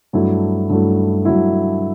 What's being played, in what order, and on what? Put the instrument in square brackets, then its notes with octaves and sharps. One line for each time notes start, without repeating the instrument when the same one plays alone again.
[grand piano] G2 F#3 A3 E4
G2 F#3 A3 E4
G2 F#3 A3 E4